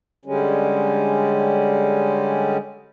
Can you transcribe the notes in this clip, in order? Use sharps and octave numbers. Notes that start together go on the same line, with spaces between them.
D3 G3 G#3 C#4